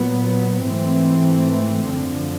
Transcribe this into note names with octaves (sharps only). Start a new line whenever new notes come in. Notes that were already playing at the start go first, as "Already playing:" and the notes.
Already playing: A#2 F#3 B3
G#2 E3 A3 C4
F#2 D3 F3